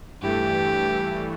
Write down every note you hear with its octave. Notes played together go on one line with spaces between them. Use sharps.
G2 E3 A3 G4